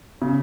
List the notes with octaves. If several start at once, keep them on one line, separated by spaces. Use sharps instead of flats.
C#3